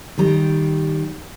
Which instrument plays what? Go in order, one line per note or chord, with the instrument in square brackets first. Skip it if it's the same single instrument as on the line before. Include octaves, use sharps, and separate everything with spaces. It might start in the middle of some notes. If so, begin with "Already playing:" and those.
[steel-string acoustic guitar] D#3 G3 G4 A#5